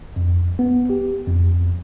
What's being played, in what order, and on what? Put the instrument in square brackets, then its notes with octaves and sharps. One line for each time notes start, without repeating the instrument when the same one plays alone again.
[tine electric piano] F2
B3
G4
F2